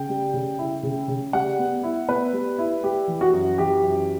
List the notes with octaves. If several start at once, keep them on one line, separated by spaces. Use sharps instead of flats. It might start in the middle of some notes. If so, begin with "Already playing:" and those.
Already playing: C#3 G5
G3
C#3
E4
C#3
C#3
G3 F#5
B3
E4
B3 B4
G3
E4
G3 G4
E3
F#4
F#2
E3 G4
F#2